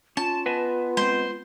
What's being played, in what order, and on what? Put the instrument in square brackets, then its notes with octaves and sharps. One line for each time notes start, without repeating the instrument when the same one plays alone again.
[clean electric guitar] C#4 [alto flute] F4 [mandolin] A5
[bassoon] B3 [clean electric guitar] B4 D#5 G#5
[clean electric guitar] G#3 C4 [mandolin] C5